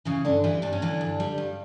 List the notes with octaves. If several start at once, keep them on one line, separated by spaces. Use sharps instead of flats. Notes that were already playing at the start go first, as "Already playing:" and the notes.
C#3 E3 C#4
G2 D3 D4
E3 G3 E4
G2 D4
C#4
D3 E3 D4
G2
G3
G2